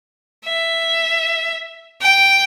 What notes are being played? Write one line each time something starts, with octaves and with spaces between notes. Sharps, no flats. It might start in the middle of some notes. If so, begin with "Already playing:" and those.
E5
G5